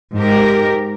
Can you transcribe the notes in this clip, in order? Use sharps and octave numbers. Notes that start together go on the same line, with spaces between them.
G#2 G4 A#4